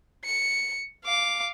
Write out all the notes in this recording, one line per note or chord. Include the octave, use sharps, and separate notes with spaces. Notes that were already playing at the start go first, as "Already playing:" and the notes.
C#7
F5 D6